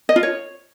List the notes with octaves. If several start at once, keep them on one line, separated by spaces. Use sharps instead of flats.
D#5
F4
C#5